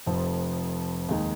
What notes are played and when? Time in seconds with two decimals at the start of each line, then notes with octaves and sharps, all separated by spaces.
0.06 F1 F2 F3
1.09 D#2 D#3 G#3 D#4